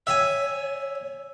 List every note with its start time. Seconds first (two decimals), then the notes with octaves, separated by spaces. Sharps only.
0.07 C#5 E5 G#5